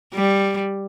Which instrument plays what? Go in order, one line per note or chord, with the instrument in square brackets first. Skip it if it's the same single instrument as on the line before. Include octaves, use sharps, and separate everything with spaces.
[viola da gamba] G3